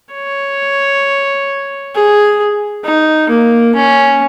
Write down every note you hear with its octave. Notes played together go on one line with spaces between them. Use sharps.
C#5
G#4
D#4
A#3
C#4